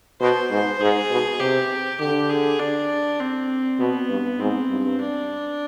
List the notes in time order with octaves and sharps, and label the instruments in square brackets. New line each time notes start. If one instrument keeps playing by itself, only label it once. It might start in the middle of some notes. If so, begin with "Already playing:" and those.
[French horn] B2 [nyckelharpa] C5
[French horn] G#2
[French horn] G#2 [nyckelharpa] G#4
[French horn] B2
[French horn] C3 [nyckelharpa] G4
[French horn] D3 [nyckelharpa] G4
[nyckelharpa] G#4
D4
C4
[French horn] B2 [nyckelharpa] B3
[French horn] G2
[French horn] G#2 [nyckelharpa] C4
[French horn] G2
[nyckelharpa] D4